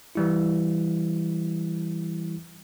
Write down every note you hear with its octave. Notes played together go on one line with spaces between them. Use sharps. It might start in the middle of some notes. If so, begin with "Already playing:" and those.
E3 G3 E4